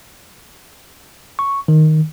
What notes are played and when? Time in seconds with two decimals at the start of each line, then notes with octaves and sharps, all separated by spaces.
1.39 C#6
1.68 D#3